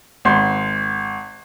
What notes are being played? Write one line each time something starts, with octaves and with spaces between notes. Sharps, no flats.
G#1 C6